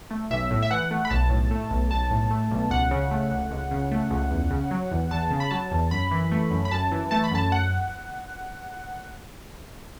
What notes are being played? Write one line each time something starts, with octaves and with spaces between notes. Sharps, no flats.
A3
B1 E5
A2
E5
E3 F#5
A3
B5
B1 A5
A2
A3
B1
B1 A5
A2
A3
B1
C#2 F#5
C#3
A3
C#2
C#2
C#3
A3
C#2
E2
C#3
F#3
E2
E2 A5
C#3
B5
F#3 A5
E2
F#2 B5
E3
A3
F#2
B5
F#2 A5
E3
A3 A5
B5
F#2 A5
F#5